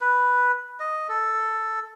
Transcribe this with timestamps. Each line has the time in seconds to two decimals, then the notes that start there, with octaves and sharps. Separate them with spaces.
0.01 B4
0.80 D#5
1.09 A4